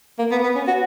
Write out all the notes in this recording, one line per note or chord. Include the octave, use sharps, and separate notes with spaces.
A#3
B3
B3
C#4
F#4